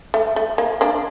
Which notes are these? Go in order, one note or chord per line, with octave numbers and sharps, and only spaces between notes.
A3
A3
A#3
A#3 D4